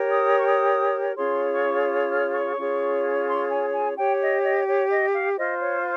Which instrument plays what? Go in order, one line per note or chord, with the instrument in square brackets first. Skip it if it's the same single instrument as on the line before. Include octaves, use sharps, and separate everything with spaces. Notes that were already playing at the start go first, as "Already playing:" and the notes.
Already playing: [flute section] G4 A#4 C#5
D#6
C#6
D#6
C#4 F4 G#4 C#5 C6
C#6
F6
C#6
C#4 F4 G#4 C#5
C6
G#5
G#5
G4 C#5 G5
D#5
D#5
C#5
D#5
F5
F4 C5 D#5
C#5